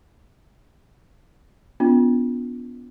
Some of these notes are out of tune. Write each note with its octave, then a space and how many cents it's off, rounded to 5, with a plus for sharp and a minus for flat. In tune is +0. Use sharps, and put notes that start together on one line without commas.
B3 +0 D4 -45 F4 +0